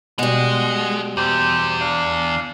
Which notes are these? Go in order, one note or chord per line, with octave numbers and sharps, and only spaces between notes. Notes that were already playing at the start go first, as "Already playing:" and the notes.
B2 G3 G#3 D#5 F#5
E2 G4 C5
D4 F5